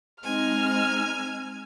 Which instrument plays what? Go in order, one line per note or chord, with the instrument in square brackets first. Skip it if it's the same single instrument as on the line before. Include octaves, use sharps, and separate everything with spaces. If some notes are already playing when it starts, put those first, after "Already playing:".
[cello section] G#3 C4 D#4 [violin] G#5 [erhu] F6